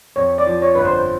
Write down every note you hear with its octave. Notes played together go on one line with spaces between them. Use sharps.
F2 C#5
D5
F3
C#5
G1 B4
C5